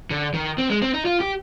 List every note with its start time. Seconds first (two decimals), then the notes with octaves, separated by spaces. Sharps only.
0.10 D3
0.34 D#3
0.58 C4
0.70 G#3
0.82 C4
0.94 D#4
1.05 F4
1.20 G4